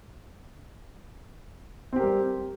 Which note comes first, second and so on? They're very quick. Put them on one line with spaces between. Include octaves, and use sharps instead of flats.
C4 G4 A#4 G3